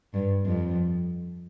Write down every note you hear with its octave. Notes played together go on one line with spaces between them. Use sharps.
G2
F2